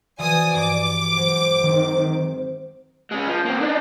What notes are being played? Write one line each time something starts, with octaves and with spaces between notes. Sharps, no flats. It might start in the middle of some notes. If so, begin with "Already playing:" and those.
E3 F3 F#4 D5 G#5 D#6
G2 D6
F#3 G#3 C5
D#3 C4
G#3 C#4
F3
A#3 C4
D4 D#4